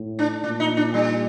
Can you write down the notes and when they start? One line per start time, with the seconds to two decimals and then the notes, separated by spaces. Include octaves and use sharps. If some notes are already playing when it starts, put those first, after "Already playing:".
Already playing: A2
0.19 D4
0.44 A#2 D4
0.60 D#4
0.77 D4
0.94 G3